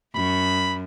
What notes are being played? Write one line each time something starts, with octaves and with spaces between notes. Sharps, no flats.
F#2 B5